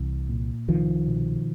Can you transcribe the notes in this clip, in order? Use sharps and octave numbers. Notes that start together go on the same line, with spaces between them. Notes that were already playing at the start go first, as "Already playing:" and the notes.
Already playing: C2 E3
A#2
C2 D#3 F3
B2